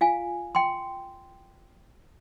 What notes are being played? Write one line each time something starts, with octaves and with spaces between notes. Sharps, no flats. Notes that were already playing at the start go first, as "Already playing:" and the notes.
F4 F5 G#5
G5 C6